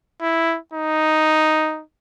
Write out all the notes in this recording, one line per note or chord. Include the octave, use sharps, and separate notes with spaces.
E4
D#4